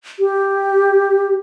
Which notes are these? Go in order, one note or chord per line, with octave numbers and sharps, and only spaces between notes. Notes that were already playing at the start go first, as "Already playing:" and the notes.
G4